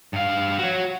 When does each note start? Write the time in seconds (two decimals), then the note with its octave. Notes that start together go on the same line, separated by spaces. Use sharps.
0.13 G2 F5
0.59 F#4 C#5